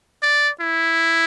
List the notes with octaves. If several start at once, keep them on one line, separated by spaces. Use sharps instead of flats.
D5
E4